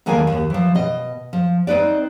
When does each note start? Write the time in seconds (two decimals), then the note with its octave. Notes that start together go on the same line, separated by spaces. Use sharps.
0.06 E2 D3 D#3 A#3 F5 G#5
0.27 D#2
0.50 E3 F3
0.75 B2 D#5
1.33 F3
1.67 C4 D#4 B4 D5